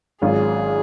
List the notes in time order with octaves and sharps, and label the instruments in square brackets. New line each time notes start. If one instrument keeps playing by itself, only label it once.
[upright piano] G#1 G#2 F#3 C#4 F4 [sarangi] G#4